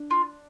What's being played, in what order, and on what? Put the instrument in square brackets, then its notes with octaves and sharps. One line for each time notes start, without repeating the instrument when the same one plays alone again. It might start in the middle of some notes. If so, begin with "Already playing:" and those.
Already playing: [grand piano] D4
[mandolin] F4